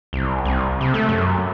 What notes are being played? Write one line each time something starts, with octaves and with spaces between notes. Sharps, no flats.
C2
C2
C3
A3
F#2